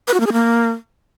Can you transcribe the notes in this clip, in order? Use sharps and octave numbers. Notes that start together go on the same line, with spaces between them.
B4
F#4
A#3
G#4
A#3